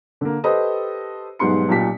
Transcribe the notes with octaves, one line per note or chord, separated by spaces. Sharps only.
D3 A#3
G4 A4 B4 C5 D#5 D#6
B1 G#2 G3 B3 C6 C#7
B1 A#2 G4 A5 B6